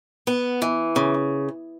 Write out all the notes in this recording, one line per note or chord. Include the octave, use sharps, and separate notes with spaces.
B3
E3
C#3